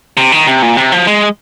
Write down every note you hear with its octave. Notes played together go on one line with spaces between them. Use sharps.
C3
D#3
C3
A#2
C3
F3
G#3